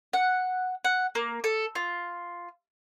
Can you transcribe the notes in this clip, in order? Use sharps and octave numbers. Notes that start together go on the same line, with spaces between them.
F#5
F#5
A#3
A4
F4